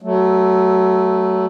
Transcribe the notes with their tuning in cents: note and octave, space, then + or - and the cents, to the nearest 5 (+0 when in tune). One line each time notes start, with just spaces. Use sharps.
F#3 +25 A3 +0